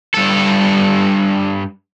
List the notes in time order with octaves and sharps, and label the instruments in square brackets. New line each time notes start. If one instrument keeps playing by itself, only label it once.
[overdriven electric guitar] G2 A4